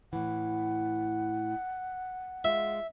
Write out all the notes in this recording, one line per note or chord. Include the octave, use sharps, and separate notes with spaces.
A2 E3 F#5
G#3 F4 E5